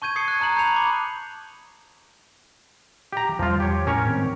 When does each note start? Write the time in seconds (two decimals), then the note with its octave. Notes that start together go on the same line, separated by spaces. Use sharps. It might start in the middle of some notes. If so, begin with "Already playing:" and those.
0.02 A5 C#6 G6 G#6 D#7
0.16 D#6 G#6 C7 C#7
0.28 F#6
0.40 A5 A#5 F#6 F#7
0.56 B5 G6 C#7 F7
0.76 D6
3.13 G4 A#5
3.39 E2 F3 G3 F4
3.60 G4 C#5
3.87 A2 C#4 A#4 C#5
4.06 G#2 D#3 C4